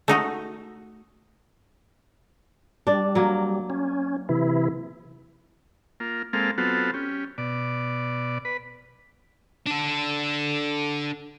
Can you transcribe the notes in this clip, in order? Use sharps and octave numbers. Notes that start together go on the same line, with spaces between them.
A3 D#4 F#4
G3 D4 D5
F#3 A#3
C#4
C3 E3 E4
A#3 F4
G#3 A#3 C4 A4 F5
F#3 B3 C4 F4 F#4 A4
C#4 G4
B2 D5
B4
D4 A4